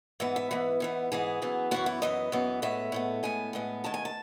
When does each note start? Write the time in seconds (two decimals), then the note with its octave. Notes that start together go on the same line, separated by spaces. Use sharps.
0.20 G#2 E3 B3 E5
0.36 E5
0.51 G#2 E3 B3
0.80 G#2 E3 B3
1.12 G#2 E3 B3 G#4
1.42 F#2 E3 B3
1.71 F#2 E3 B3 F#4
1.86 E4
2.02 F#2 E3 B3 D#5
2.32 F#2 E3 B3
2.62 A2 G#3 B3 E5
2.92 A2 G#3 B3
3.23 A2 G#3 B3 G#5
3.53 A2 G#3 B3
3.84 D#2 D#3 G#3 A5
3.94 G#5
4.05 A5